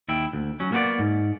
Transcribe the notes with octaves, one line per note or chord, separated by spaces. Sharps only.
D#2 E4 G5
D2
F#3 C#4
A#3 B3 F#4 B4 D5
G#2